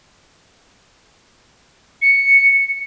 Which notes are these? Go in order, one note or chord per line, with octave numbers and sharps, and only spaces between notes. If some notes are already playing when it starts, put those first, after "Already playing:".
C#7